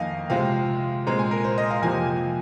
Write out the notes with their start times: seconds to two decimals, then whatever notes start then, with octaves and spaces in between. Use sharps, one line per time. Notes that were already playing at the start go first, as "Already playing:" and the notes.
Already playing: F2 D#3 A#3 D#5 F5 G#5
0.30 C3 F3 G#3 C4 F5
1.06 A#2 G#3 C4 A#5
1.19 G#5
1.31 A#4
1.44 C5
1.58 D#5
1.71 F5
1.82 F2 C3 F3 A#3 G#5